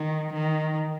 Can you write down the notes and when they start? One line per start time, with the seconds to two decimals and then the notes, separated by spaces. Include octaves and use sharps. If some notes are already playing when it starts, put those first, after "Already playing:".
Already playing: D#3
0.34 D#3